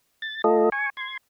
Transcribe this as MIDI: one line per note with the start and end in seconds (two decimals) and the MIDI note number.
0.22 0.42 93
0.44 0.70 57
0.44 0.70 65
0.44 0.70 69
0.44 0.70 75
0.72 0.90 80
0.72 0.90 85
0.97 1.17 84
0.97 1.17 92